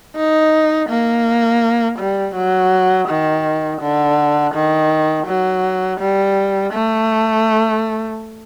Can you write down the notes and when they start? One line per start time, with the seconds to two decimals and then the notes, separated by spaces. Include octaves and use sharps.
0.16 D#4
0.89 A#3
1.99 G3
2.35 F#3
3.08 D#3
3.81 D3
4.54 D#3
5.27 F#3
6.00 G3
6.73 A3